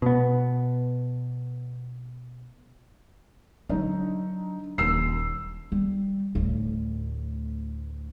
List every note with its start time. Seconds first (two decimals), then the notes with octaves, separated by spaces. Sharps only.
0.02 B2 B3
3.69 D3 F#3 D#4
4.78 D#1 D#2 E6 C7
5.72 G3
6.35 D2 A2